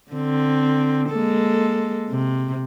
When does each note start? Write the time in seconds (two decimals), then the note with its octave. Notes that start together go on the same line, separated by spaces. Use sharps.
0.12 D3 C4
1.10 G#3 A#3 A4
2.09 C3